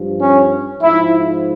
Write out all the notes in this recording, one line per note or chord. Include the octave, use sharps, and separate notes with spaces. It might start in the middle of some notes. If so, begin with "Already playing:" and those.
Already playing: G2 F3
C#4
G#2 F3 E4